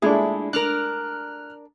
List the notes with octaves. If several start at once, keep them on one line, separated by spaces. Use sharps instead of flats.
A#2 G#3 A3 D4 E4 G#4
D4 A#4 F6 F#6